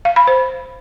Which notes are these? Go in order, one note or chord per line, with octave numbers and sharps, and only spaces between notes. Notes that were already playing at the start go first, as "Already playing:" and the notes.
F5
B5
C5